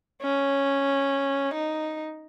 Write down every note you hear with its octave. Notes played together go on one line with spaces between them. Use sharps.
C#4
D#4